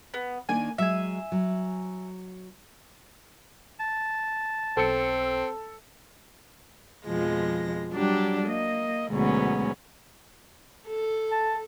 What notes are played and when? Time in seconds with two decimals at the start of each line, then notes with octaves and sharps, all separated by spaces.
0.14 B3
0.49 D#3 A#3 D4 G#5
0.78 F#3 G#3 E5 G#5
1.32 F#3
3.80 A5
4.77 B1 C4 A4 C#7
7.06 F2 B2 F3 G#3 A#6
7.92 F#3 G3 D4 G4
8.45 A#3 D#5
9.11 D2 G#2 B2 F#3 B3 C#4
10.88 A4
11.31 A5